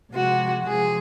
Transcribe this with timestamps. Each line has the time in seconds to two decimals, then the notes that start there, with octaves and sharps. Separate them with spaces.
0.14 C3 F3 G#3 F#4
0.66 C3 F3 G#3 G#4